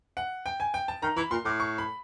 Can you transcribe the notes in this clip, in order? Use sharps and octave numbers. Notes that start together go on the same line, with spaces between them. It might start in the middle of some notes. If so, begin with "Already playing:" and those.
F#5
G5
G#5
G5
A5
D#3 A#5
E3 B5
A#2 C6
A2 D6
C#6
B5